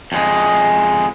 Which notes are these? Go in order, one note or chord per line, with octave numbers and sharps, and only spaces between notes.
F2 G#3